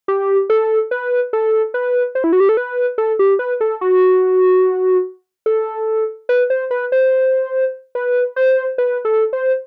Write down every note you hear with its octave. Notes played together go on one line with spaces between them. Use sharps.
G4
A4
B4
A4
B4
C5
E4
F#4
G4
A4
B4
A4
G4
B4
A4
F#4
A4
B4
C5
B4
C5
B4
C5
B4
A4
C5